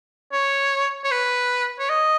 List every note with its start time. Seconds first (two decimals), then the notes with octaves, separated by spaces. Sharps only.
0.33 C#5
1.04 C#5
1.11 B4
1.79 C#5
1.89 D#5